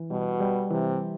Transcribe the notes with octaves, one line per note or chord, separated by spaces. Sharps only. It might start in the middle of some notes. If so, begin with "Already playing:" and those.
Already playing: E3
B2 G3
G3
C3 E3